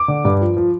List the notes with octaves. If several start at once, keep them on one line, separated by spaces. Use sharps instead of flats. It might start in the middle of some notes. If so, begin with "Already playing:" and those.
Already playing: D6
D3
G2
F3
F3